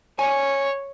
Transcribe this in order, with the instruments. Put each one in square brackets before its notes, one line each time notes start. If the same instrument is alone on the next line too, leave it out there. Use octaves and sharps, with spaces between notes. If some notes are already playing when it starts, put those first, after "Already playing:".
[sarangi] C#5 [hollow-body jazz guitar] D5 G#5